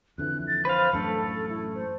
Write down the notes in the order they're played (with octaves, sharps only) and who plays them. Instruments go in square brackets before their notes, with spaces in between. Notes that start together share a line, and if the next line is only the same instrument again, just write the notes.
[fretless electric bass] F2 D3 E3 [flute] F#6
[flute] A6
[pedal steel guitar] B4 F5 [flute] C5
[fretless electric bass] A1 F#2 D4 [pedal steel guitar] A3 [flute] A4
[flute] E4
C5